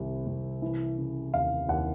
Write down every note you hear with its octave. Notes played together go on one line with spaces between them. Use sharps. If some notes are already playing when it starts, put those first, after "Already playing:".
Already playing: C2 C3 D#3
C2
E3
C#3
D#2 F5
D#2 F#5